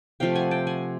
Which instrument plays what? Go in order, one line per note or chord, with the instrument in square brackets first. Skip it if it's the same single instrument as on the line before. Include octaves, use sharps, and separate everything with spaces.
[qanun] C3 F3 A3 F5 G5
F#5 G#5
G5 A5
F#5 G#5